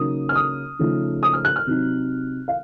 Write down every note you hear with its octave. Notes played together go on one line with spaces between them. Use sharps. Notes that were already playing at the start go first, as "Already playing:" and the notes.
Already playing: C#3 F#3 A#3 D#4 D#6
F6
D#6
C#3 F3 A3 D#4
D#6
F6
F#6
F6
C3 F#3 C4 D#4
F5